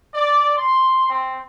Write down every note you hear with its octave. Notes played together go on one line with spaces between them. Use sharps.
D5
C6
C4